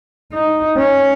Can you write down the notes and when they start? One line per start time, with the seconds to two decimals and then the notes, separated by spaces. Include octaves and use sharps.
0.33 D#4
0.77 C#4